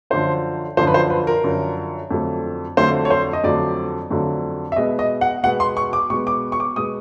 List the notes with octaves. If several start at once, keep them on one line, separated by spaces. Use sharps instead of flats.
F#2 D3 F3 C5
F#2 D3 F3 C5
B4
C5
B4
A#4
F#2 D3 F3
F2 D3 F#3 A3
F2 D3 F#3 A3 C5
C#5
C5
D#5
F2 D3 F#3 A3 D5
F2 D3 F#3 A3
E5
B2 G#3 B3 D#5
D#5
F#5
B2 G#3 B3 F#5
C6
C#6
D6
B2 G#3 B3 C#6
D6
C#6
D6
B2 G#3 B3 D#6